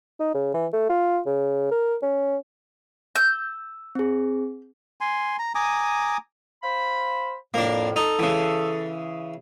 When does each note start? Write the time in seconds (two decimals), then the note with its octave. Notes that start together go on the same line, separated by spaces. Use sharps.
0.20 D#4
0.34 C#3
0.54 E3
0.73 A3
0.90 F4
1.26 C#3
1.71 A#4
2.02 C#4
3.16 E6 G6
3.95 C4 G#4
5.01 G#5 C6
5.39 A#5
5.55 G#5 A#5 D6 D#6
6.63 C5 F5 B5
7.54 F2 A2 A#3 D4
7.96 D#4 A4
8.19 C#3 E3